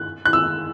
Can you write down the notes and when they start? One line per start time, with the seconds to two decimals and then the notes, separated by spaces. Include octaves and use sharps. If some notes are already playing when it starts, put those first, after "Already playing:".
Already playing: F#6
0.25 F#6
0.33 E6